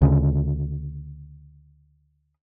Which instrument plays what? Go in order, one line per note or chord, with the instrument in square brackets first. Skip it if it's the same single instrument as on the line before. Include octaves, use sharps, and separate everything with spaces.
[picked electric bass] D2 C#3